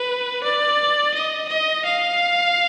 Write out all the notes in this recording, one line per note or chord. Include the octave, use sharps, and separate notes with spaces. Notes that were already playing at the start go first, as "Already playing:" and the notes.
Already playing: B4
D5
D#5
D#5
F5